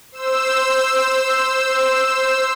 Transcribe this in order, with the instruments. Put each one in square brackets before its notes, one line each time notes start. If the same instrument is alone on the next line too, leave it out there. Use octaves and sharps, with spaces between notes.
[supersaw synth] C5 E6